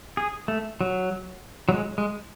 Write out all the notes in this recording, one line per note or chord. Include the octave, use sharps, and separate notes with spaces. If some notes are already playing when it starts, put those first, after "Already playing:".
G#4
A3
F#3
F#3
G#3
G#3